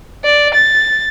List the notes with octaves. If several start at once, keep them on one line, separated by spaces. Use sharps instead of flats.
D5
A6